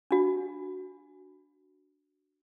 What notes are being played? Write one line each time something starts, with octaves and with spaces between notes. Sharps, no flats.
D4 F#4